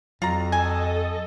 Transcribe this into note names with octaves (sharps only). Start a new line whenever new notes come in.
F2 F#3 F4 A#5
A4 D#5 G#5